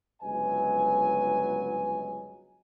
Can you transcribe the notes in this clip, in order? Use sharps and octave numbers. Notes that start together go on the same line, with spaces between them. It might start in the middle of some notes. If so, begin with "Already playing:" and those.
G1 C#2 F#3 B4 D#5 G#5